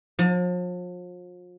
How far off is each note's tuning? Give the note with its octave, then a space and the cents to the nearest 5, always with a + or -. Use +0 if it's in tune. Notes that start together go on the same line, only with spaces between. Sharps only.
F3 +40